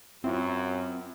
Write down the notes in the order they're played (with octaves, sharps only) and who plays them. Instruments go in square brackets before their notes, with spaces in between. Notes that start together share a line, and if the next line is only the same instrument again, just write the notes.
[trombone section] F#2 [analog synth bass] C4 [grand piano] E4 F4